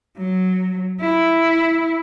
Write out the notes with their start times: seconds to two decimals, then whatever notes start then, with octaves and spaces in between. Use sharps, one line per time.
0.17 F#3
1.00 E4